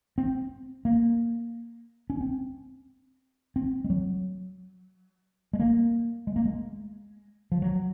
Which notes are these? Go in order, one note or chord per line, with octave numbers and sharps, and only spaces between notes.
C4
A#3
C#4
C4
C4
G#3
F#3
G#3
A#3
G#3
A#3
G#3
F3
F#3